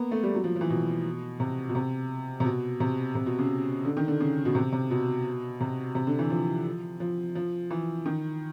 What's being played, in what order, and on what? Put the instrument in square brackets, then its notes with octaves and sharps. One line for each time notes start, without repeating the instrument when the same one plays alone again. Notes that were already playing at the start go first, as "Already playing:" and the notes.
Already playing: [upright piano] A#3 B3
A3
G3
F#3
F3
F3
E3
B2
C3
B2
C3
C3
B2
C3
C3
B2
C#3
D3
D#3
D3
C#3
B2
C3
C3
B2
C3
C3
D3
E3
F3
F3
F3
E3
D#3